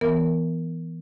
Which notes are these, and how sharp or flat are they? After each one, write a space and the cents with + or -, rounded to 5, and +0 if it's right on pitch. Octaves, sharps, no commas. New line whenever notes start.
E3 +0 B3 +0 A#4 -10